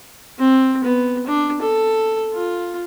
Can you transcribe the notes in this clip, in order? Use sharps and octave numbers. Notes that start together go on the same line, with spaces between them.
C4
B3
D4
A4
F4